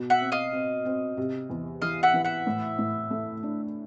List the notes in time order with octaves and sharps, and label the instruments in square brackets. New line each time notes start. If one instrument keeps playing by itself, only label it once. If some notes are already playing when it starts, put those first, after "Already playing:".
Already playing: [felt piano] B2
[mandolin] E5 F#5
[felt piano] C4
[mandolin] D#5 F5
[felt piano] C4
C4
C3
E2
[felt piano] E3 [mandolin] D#5 F5
[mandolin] E5 F#5
[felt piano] E3
[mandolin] E5 F#5
[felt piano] A2
A2
A3
D4